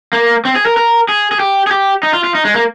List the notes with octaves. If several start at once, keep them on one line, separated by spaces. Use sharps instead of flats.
A#3
C4
G#4
A#4
A#4
G#4
G#4
G4
G#4
G4
D#4
F4
F4
D#4
G#3
A#3